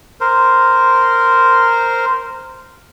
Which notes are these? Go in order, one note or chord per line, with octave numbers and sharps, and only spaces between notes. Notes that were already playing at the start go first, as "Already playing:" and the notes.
A#4 C5